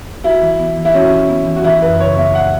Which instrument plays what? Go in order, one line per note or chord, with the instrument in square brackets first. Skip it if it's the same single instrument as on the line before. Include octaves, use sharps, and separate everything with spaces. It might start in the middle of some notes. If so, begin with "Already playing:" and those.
[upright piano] E4 [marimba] F#4
[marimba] E3
B3
E3
[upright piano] E4
[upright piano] C#4 [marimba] F#4
[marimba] E3
B3
E3
[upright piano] F#4
[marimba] E3 [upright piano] E4
[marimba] F#2 [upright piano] B4
[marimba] C#3 [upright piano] C#5
[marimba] B3 [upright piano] E5
[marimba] E3 [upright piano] F#5